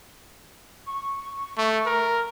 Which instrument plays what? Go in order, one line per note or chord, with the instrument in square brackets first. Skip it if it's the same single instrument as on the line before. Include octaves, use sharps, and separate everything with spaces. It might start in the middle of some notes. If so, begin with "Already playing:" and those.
[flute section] C#6
[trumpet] A3
A#4